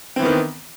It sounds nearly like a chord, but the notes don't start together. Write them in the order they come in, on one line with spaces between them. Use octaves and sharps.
C4 E3 B3 D#3